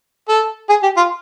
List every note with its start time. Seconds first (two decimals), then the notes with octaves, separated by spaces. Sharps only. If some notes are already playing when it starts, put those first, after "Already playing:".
0.28 A4
0.69 G#4
0.83 G4
0.97 F4